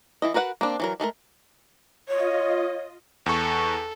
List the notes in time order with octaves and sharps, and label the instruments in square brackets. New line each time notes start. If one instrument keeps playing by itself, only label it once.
[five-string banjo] E3 E4 D#5
F#4 A#4 B4 F5 F#5
A#3 C4 D4
E3 F#3 A#4
G#3 A3 A4 A#4
[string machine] F4 D#5 [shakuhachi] C#5
[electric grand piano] E2 C#6 [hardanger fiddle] A4